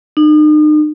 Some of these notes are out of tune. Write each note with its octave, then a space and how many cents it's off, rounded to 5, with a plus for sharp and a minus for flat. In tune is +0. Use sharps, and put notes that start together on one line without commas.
D#4 -40